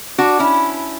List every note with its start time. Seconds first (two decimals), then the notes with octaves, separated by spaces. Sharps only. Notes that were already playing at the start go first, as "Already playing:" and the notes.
0.18 D4 F#4
0.39 C#4 E4